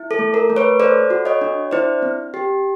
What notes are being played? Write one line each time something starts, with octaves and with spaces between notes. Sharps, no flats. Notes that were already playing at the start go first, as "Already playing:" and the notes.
Already playing: E4
A4
A3
A#4
A3
B4 C#5
A4 C5 D5
F#4
C#5 D#5
D4
E4 C5 D5
C4
G4